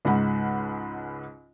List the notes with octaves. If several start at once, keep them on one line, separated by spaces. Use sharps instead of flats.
C#2 G#2 F#5 B5